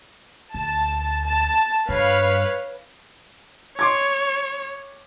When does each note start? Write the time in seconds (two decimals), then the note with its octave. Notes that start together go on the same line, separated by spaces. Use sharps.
0.54 D2 A5
1.26 A5
1.89 G2 B4 C#5 F5
3.79 C#5 C6 D6 G#6